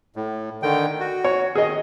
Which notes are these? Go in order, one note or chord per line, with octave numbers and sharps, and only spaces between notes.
A2
D3 D#3 G5
F#4
C#5
D#3 G#4 D#5